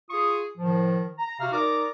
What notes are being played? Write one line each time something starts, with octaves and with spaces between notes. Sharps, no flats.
F4 G#4 C#6 D#6
A2 D#3 F3
A#5
C3 F#4 E5 F5 F6
D#4 A#4 D5 A#5 D6